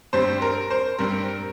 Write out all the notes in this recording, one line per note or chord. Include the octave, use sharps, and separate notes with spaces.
G2 G3 C4 C5
A#4
C5
G2 G3 C4 A#4